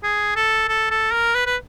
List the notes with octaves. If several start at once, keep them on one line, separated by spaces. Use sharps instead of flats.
G#4
A4
A4
A4
A#4
B4
B4